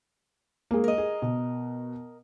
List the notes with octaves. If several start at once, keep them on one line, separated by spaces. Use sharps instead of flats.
G#3 A#3
A#4 D#5
G#4
B2